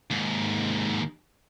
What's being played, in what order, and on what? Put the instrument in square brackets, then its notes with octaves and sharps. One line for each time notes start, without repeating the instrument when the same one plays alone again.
[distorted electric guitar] D#2 G#2